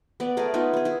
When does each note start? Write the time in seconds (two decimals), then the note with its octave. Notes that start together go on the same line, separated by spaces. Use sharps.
0.20 B3 D5
0.37 A3 G#4 A#4 D5
0.54 B3 D#4 F4 G#4
0.73 B3 G#4
0.85 E4 G#4